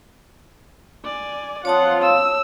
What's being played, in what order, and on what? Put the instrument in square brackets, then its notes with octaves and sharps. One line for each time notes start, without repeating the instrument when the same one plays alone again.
[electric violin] D5 G#5
[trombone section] F3 C4 F4 [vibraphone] C#5 A5 D#6 [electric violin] F#5
[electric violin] E6